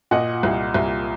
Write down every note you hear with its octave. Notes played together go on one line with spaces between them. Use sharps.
A#2 D#5 F#5
C2
C2